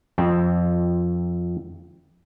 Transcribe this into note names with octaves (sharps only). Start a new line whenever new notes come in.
F2 C4